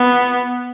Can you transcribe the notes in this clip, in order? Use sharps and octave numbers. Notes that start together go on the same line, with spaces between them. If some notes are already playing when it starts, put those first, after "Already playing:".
Already playing: B3